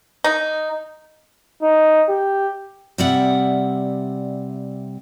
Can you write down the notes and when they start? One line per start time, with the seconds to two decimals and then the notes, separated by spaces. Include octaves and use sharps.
0.24 D#4
1.63 D#4
2.09 G4
2.98 C3 G3 D5 E5 F#5